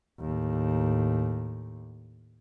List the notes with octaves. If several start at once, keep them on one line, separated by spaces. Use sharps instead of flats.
D#2 A2